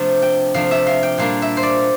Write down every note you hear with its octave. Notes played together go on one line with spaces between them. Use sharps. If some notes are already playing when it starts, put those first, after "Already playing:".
Already playing: C3 F3 A3 D4
G5
C3 F3 A3 D4 F5
E5
F5
G5
A#2 G3 A#3 D4 F5
E5
C5
D5